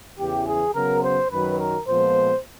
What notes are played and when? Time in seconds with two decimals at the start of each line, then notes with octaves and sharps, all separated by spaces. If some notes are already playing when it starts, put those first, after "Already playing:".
0.18 E2 C#3 E3 G4
0.47 G#4
0.75 C#3 F#3 B3 A#4
1.03 C5
1.31 F#2 D#3 F#3 B4
1.59 A#4
1.87 A#2 F3 G#3 B3 C5